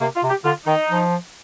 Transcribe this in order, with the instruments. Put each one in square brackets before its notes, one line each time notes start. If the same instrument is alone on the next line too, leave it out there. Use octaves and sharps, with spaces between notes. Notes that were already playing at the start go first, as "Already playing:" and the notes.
[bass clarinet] C3 [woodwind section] A#3
[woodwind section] F4
[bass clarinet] C3
[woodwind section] G4
[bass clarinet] D3 [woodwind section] F4
[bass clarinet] D#3 [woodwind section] D#4
[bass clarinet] F3